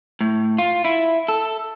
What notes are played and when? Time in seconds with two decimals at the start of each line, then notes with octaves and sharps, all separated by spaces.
0.21 A2
0.58 F4
0.85 E4
1.28 A4